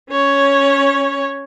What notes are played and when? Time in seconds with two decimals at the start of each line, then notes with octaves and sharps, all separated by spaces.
0.10 C#4 C#5